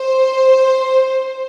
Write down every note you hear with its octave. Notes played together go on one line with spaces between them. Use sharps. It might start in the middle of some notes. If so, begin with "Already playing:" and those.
Already playing: C5